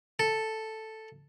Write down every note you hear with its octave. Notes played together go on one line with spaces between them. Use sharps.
A4